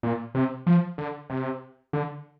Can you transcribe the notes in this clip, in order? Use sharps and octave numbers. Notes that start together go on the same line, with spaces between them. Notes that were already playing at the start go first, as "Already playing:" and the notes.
A#2
C3
F3
D3
C3
D3